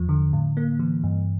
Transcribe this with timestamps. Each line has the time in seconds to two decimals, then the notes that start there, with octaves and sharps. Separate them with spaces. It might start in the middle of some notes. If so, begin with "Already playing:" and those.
Already playing: E2 F3
0.09 D3
0.33 A2
0.57 A#3
0.79 E3
1.04 G2